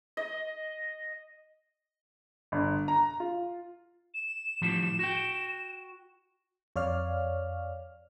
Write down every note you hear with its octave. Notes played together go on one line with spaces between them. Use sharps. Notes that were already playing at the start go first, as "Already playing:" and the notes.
D#5
G1
A#5
F4
E7
A2 F3 G3
F#4 G5
F2 C#5 D5 F5 F6